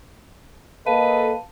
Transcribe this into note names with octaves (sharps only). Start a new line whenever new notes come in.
A#3 A4 B4 D#5 F5 A5 D#7